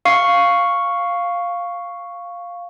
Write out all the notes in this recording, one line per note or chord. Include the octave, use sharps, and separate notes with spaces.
F5 C#6 C7